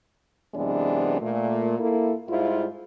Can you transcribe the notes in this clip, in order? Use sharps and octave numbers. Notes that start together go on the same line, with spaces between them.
F#2 C3 E3 G#3 B3 D4
A#2 A3
A#3 E4 A4
G#2 G3 E4 F4